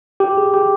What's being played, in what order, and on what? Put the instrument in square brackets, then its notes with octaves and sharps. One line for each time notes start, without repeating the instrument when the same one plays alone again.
[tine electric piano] G4
G#4
G4